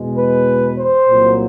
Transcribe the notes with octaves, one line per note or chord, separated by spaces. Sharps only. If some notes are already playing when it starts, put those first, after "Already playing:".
Already playing: E2 B2 G#3
B4
C5
C2 A#2 F#3